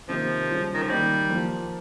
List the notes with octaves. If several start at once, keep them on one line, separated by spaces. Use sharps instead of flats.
C3 D#3 F3 A#3
C#3 G3 C#4 F4
D#3
F3
D#3 G3 A#3 D#4
F3 A#3 F4